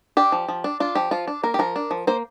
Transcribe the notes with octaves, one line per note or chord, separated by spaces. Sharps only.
D4 G4
F3
F3
D4
D4 F4
F3 G4
F3 F4
D4
A#3 A#4
G4
F3 A#4
D4
F3
A#3 C5